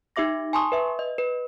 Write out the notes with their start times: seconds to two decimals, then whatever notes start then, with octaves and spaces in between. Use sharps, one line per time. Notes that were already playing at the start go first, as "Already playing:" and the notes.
0.16 D#4 G4 E5 D6 A#6
0.53 G#5 A5 C6 C#6 D#6
0.72 B4 E5
0.99 D#5
1.18 B4